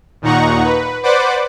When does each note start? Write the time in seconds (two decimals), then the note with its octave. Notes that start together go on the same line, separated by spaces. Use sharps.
0.22 D#2 A#2 D#4 F#5 A#5 C#6
0.64 B4
1.03 B4 C5 D5 F#5 D6